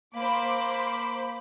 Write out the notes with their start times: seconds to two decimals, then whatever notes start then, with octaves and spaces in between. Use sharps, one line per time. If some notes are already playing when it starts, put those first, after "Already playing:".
0.15 A#3 C5 B5 D6